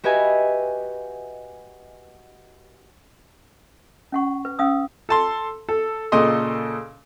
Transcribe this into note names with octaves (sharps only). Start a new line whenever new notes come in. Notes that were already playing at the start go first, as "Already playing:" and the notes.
F#4 G4 B4 D#5 E5 G#5
C#4 F#5 C#6
B4
C#4 F5 D#6 E6
A4 A5 C6
A4
A#2 C#3 A4 D#5 C6